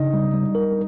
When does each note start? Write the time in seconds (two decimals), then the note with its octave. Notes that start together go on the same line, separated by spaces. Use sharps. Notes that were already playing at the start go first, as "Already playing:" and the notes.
Already playing: C#3 D#4 D#5
0.14 G3
0.34 G3
0.55 A#4